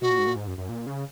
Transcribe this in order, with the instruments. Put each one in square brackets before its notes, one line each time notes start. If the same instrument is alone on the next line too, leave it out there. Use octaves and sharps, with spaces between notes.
[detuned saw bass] B2 [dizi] F#4
[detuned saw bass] A#2
G#2
A#2
G#2
F#2
F#2
A#2
C#3